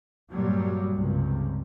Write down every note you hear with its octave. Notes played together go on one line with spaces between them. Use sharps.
G2 A#2 F#3 G3
C#2 G2 C3